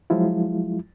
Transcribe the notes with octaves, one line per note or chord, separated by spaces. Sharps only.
F3 F#3 G#3 E4 F4